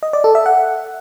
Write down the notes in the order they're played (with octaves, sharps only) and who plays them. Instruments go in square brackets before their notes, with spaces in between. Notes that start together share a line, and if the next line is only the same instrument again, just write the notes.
[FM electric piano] D#5
D5
A4
E5
F#5